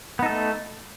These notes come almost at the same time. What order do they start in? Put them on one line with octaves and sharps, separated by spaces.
B3 D#4 A4 A3